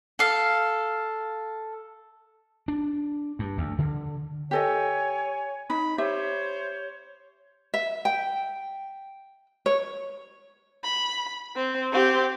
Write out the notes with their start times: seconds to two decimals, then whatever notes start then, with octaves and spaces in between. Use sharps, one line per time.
0.19 A4 F5
2.68 D4
3.39 G2
3.58 D2
3.79 D3
4.51 G4 A4 C#5 D#5 G#5
5.70 D#4 B5
5.98 G4 C5 C#5 E5
7.74 E5
8.05 G5
9.66 C#5
10.84 B5
11.56 C4
11.92 C4 G4